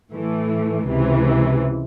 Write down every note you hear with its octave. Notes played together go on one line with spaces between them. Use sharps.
A2 E3 A3
C#2 C3 E3